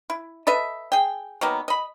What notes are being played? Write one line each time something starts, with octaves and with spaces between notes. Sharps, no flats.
E4
A4 B4 D#5 E5
G#4 G5
D#3 F#3 A#3 B3
D#5 B5